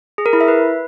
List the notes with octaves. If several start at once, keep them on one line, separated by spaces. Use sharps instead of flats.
G#4
A#4
E4
E5
B4